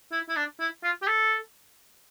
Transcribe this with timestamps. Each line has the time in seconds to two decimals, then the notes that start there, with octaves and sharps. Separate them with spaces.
0.12 E4
0.29 E4
0.37 D4
0.60 E4
0.84 F4
1.02 G4
1.08 A4